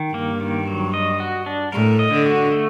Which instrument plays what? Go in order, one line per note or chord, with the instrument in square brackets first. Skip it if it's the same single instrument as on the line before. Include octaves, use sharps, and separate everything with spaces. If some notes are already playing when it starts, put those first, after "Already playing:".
Already playing: [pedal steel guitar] D#3
[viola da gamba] G2 [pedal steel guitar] A#3
[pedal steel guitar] D#3
F#3
D#5
F#4
D4
[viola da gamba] A2 [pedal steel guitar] A#4
[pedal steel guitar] D#5
[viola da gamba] D3
[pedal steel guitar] F#4
A3